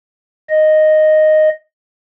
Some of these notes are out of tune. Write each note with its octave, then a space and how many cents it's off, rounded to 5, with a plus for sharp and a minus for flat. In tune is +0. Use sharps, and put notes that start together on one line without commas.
D#5 -5